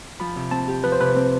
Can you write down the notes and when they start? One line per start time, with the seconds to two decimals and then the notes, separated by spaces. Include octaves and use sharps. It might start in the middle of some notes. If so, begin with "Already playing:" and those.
0.20 F3 B5
0.36 C3
0.51 C4 A5
0.68 G4
0.84 F3 B4
0.92 C5
1.00 C3 B4
1.16 C4